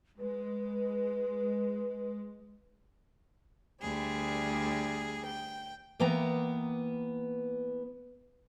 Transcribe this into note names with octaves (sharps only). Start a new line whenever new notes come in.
G#3 B4
D2 G3 G#4
G5
E3 A#3 B3 G5 A#5